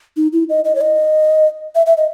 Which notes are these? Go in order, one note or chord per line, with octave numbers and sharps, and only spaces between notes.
D#4
E4
D#5
D#5
C#5
D#5
E5
E5
D#5